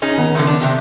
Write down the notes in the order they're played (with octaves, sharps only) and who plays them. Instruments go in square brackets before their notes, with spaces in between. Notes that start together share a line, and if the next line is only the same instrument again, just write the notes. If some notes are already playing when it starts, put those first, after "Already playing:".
[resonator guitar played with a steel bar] C#4 D#4 G#4
[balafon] D#3 B3
[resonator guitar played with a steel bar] D3 F3 A3
D4
C3 G4